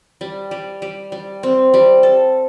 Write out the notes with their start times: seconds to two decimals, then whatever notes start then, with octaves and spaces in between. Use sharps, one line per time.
0.21 G3
0.51 G3
0.82 G3
1.12 G3
1.43 C4
1.74 G3
2.03 A4